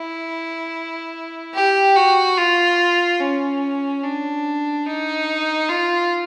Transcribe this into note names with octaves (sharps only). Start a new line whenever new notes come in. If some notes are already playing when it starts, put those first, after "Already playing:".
Already playing: E4
G4
F#4
F4
C#4
D4
D#4
F4